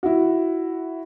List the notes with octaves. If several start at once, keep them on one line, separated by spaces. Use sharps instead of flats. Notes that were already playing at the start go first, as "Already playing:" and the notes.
E4 F#4